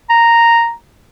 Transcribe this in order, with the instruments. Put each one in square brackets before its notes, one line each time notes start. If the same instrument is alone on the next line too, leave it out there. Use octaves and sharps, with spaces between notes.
[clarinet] A#5